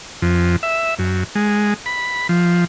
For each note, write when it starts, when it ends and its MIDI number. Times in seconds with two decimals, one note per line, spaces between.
0.22 0.56 41
0.63 0.94 76
0.99 1.23 42
1.35 1.74 56
1.86 2.27 83
2.29 2.64 53